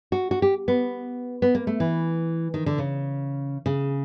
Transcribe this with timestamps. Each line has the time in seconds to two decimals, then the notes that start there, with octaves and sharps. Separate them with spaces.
0.12 F#4
0.31 F#4
0.42 G4
0.68 B3
1.42 B3
1.55 A#3
1.67 A3
1.80 E3
2.54 D#3
2.66 D3
2.78 C#3
3.66 C#3